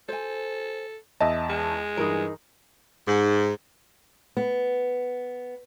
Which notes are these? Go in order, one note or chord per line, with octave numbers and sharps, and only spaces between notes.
A4 C5 G#5
E2 D#5 E5 A5
G#3
G2 E3 D#4 G#4 A#4
G#2
B3